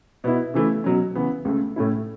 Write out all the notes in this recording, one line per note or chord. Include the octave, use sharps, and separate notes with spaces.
B2 B3 E4
C#3 E3 A3 E4
B2 F#3 C#4
C#3 E3 B3
C#2 C#3 A3
A2 A3 C#4 E4